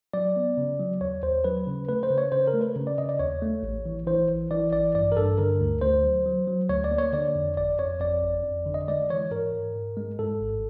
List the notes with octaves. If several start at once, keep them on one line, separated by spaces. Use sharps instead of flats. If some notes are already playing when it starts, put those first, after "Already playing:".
F#3 D5
B3
C#3
F#3
D#2 C#5
D#2 C5
F#3 B4
C#3
A3 B4
C5
C#3
C#5
C#3 C5
A#4
A3
B4
C#3
D5
C#3 D#5
D5
D#2 C#5
A3
A1
E3
E3 C5
A1
E3 D5
A1 D5
G2 D5
A#4
G2 A4
D3 A#4
D2
D2 C5
F#3
F#3
F#3
D2 C#5
D5
A#3
C#5
D3 D5
F2
G1 D5
F2 C#5
F2 D5
G1
F2
D3
D#5
G#3 D5
E3 C#5
G#2 A#4
G#2
G#2
G#3
G#2 A4
G#1